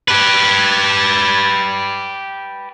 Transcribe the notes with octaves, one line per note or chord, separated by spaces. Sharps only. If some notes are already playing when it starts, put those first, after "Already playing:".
G4 B4